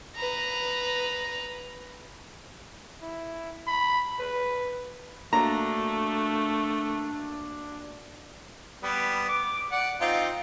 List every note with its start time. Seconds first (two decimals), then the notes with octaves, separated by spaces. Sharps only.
0.16 B4 A#5
3.02 E4
3.67 B5
4.20 B4
5.33 A3 A#3 D4 F#4 A#5
8.83 G3 B3
9.28 D6
9.72 D5 F#5
10.01 C4 D#4 F4